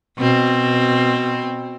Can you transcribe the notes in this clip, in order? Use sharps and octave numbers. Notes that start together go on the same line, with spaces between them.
B2 C4